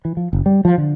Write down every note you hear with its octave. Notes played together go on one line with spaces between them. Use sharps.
E3
F3
F#1
G3
F3
D3